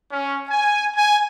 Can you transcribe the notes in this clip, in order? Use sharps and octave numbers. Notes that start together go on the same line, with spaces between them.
C#4
G#5
G#5